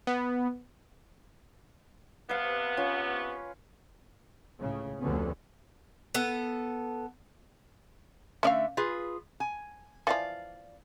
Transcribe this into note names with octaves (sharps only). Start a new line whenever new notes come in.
B3
C3 B3 B4 F5
C#4 F4
C#2 A2 C#3
F1 D2 D3 B3 C#4
B3 A4
D3 A3 C#4 D5 E5 F5
F4 G#4 B4
G#5
E3 F3 D5 F5